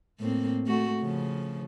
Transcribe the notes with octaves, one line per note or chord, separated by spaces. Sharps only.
A2 A#3 C4
A3 F#4
C#3 F3